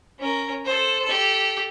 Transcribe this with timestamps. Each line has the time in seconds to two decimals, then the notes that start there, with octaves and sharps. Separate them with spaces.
0.19 C#4 A#4
0.65 A4 C5
1.05 G4 A4